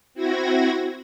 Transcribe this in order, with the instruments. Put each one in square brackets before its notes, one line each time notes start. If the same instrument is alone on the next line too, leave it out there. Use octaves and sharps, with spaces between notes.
[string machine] C4 E4 F#4 G#6 A#6